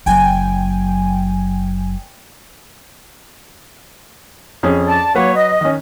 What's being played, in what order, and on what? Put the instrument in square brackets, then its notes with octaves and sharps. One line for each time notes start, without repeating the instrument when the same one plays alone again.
[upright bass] F#1 F#3 [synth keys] G5 G#5
[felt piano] F2 C#4 G#4
[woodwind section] D5 A5
[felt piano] F#3 B4 F#5 [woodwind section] A#3 C#5
[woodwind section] D#5
[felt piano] D#3 C#4